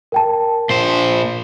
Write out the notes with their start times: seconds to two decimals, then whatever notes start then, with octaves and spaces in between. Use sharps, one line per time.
0.12 A#4 G5 A5
0.70 A#2 C5 C7